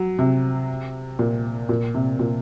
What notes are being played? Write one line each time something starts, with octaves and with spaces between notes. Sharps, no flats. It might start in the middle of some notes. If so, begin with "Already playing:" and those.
Already playing: F#3
C3
A#2
A#2
C3
A#2